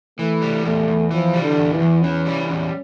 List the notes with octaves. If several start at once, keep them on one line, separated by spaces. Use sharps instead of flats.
E3 A3
G3
E2 A3
E2
E3 F3
G3
D3
E2
E3
E2
E3 C#4
G3
E2 C#4